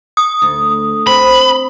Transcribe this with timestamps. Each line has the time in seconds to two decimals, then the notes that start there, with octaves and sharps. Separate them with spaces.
0.17 D#6
0.42 D2
1.07 C4 B5